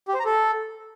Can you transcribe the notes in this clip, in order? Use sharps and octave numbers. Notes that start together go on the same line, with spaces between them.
G4
C5
A#5
A4